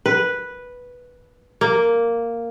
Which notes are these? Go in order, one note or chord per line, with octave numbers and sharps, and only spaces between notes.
B4
A#3